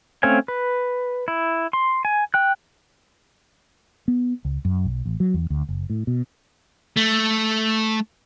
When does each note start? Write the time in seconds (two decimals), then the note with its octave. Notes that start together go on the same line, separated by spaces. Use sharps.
0.23 A3 C4 C#4 F5 G#5
0.48 B4
1.28 E4
1.73 C6
2.05 G#5
2.34 G5 F#6
4.08 B3
4.45 C#2
4.65 F#2
4.85 B1
5.05 A1
5.20 F#3
5.34 E2
5.50 D2
5.69 F#1
5.90 A2
6.07 B2
6.96 A3